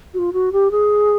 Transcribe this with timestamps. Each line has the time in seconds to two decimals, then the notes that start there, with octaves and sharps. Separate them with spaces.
0.14 F#4
0.19 F4
0.33 F#4
0.52 G4
0.71 G#4